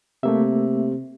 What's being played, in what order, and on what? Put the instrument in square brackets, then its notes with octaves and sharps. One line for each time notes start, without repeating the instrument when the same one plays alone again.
[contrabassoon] C3 [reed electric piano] A3 A#3 E5